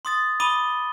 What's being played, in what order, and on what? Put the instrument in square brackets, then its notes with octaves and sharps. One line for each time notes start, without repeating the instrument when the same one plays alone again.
[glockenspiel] C6 D#6 A6
B5 D6 D#6 D#7 G7